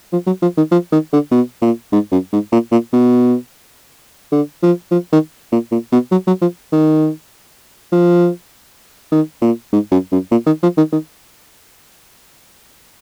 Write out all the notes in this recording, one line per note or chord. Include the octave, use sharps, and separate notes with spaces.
F3
F#3
F3
D#3
F3
D#3
D3
B2
A#2
G#2
F#2
G#2
A#2
A#2
B2
D3
F3
F3
D#3
A#2
A#2
B2
F#3
F#3
F3
D#3
F3
D#3
A#2
G#2
F#2
F#2
A#2
D#3
F3
D#3
D#3